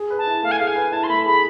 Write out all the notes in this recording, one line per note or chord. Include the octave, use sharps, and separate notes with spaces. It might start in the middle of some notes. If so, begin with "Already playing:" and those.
Already playing: G#4
B4
A5
E4
A3 F5
G#5
G#4 F5
G#5
B4
E4 A5
C6
A3 B5
G#4 B5